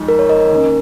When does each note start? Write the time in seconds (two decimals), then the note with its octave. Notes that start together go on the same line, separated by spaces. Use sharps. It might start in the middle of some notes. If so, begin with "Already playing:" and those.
Already playing: F2 G#3 D#4
0.08 A#4
0.19 C#5
0.29 A#4 D#5
0.40 A#4
0.50 D#3 A#3 C#4